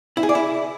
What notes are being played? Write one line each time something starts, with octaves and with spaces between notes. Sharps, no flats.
E4
G#4
D5
E4